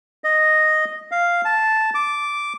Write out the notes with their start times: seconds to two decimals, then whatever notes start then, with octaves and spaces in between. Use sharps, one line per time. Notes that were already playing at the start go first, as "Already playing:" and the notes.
0.24 D#5
1.12 F5
1.45 A5
1.95 D6